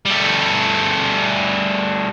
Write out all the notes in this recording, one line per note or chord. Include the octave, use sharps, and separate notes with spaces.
G3 A3